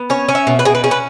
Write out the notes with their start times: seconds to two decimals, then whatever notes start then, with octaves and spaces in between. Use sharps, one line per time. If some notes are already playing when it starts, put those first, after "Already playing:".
Already playing: B3
0.10 C#4 C#5
0.29 C#4
0.35 E5
0.47 B2
0.59 B4
0.65 B2 G#4
0.75 B4
0.84 C#4 G#4
0.91 B4